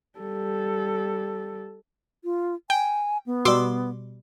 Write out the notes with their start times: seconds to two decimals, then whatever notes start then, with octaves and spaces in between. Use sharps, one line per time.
0.19 G3 A4
2.24 F4
2.70 G5 G#5
3.26 B3
3.45 B2 G3 C6 D6 E6